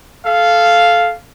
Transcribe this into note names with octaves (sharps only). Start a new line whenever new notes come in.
A4 F5